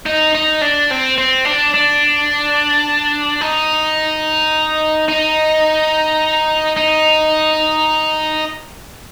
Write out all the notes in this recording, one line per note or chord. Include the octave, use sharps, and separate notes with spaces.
D#4
D#4
D4
C4
C4
D4
D4
D#4
D#4
D#4